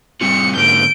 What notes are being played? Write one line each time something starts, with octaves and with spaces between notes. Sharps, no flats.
G3 C4 F4 C#7
G#2 D3 A#3 G6 D7